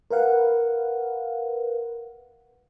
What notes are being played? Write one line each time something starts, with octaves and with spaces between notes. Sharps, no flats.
A#4 B4 F5 F#5